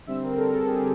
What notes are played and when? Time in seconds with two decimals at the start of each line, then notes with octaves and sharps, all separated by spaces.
0.07 D3 G3 C4 E5
0.23 A#4
0.38 A4
0.52 G#4
0.67 G4